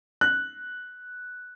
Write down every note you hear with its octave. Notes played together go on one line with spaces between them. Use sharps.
F#6